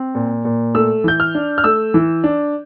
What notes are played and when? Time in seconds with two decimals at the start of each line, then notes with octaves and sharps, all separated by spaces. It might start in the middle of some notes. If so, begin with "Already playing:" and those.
Already playing: C4
0.15 A#2
0.45 A#2
0.75 A3 E6
1.04 E3 G6
1.20 F6
1.35 D4
1.58 F6
1.64 A3 E6
1.94 E3
2.24 D4